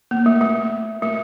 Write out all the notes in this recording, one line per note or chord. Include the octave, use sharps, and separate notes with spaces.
A#3
A3
A3
A3